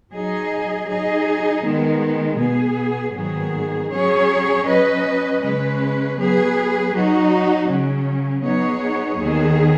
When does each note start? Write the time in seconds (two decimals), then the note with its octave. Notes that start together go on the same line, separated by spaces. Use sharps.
0.12 F#3 D#4 G#4 D#5
0.88 F#3 D#4 G#4 D#5
1.63 D#3 G#3 B3
2.38 B2 B3 G#4
3.14 G#2 D#3 F#3 B3 G#4
3.89 F#3 C#4 G#4 C#5
4.65 F#3 C#4 B4 D#5
5.41 C#3 G#3 C#4 B4
6.17 F#3 B3 G#4 B4
6.92 F#3 D#4 F#4
7.68 C#3 F#3 C#4
8.43 F#3 B3 D#4 G#4 C#5
9.18 D#2 D#3 B3 G#4